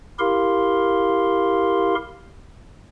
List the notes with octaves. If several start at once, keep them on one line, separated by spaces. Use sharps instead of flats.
E4 G4 A#4 F5 C6